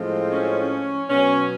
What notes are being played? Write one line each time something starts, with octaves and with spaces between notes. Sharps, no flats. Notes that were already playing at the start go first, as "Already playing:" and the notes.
Already playing: A2 F3 G#3 C4
C#4
B2 F#3 B3 C#4